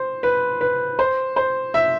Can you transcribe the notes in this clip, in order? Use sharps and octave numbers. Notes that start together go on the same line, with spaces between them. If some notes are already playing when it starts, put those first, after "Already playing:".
Already playing: C5
B4
B4
C5
C5
E5